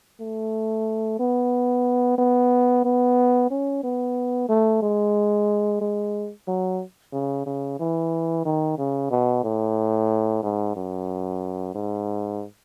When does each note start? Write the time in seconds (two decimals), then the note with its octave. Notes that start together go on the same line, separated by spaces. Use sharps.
0.21 A3
1.19 B3
2.18 B3
2.84 B3
3.50 C#4
3.83 B3
4.49 A3
4.82 G#3
5.81 G#3
6.48 F#3
7.13 C#3
7.46 C#3
7.80 E3
8.45 D#3
8.78 C#3
9.11 B2
9.44 A2
10.43 G#2
10.76 F#2
11.75 G#2